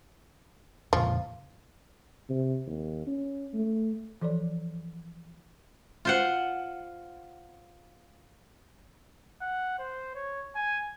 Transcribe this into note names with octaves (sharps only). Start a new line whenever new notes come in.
F2 A#2 C#3 F3
C3
D#2
C#4
A3
E3 F3 A4 C#5 D5
F4 C5 F#5
F#5
C5
C#5
G#5